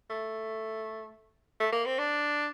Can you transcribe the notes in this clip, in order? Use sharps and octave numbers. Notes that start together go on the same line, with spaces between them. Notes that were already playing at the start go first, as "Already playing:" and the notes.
A3
A3
A#3
C4
D4